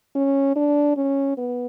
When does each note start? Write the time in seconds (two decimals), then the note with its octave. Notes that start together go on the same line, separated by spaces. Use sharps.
0.15 C#4
0.56 D4
0.97 C#4
1.38 B3